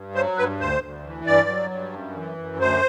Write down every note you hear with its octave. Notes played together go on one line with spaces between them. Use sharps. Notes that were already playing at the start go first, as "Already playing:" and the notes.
Already playing: G2
F#3 C5
G2 B4
D2 C5
D2
E3
G2 D5
F#3
G2
F#2
E3
F#2
D2 C5